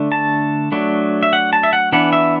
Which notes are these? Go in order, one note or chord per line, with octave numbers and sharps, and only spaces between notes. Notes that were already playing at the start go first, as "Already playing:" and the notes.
Already playing: D3 A3 D4
A5
F#3 A3 D4
E5
F#5
A5
E5
F#5
E3 B3 D4 F#5
E5